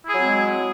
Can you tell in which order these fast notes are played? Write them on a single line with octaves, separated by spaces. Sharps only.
E4 G#4 F#3 C4 G#3